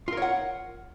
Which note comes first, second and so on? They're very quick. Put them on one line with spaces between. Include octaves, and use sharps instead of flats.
F4 A#4 C#5 F#5